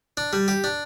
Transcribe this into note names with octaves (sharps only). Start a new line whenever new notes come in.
D4
G3
G4
D4